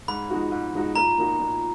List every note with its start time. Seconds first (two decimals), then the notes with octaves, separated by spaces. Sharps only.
0.08 G#2 B5
0.30 F3 G#3 D#4 F#4
0.52 G#2
0.74 F3 G#3 D#4 F#4
0.95 A#2 A#5
1.18 F3 A#3 D#4 F#4
1.39 A#2